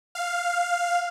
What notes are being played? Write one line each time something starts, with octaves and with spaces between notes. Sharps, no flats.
F5